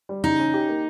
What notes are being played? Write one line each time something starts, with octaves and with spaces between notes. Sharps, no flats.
G3
C#3 D#4
C#4
G4
A#3